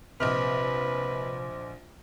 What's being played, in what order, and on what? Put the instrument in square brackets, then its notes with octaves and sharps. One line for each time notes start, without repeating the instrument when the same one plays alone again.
[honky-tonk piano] A#1 D#5 F6 [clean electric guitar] C3 [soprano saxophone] B4 [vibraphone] C5 C6 D6